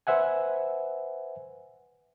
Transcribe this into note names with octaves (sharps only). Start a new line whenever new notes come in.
B4 C5 E5 F#5 G#5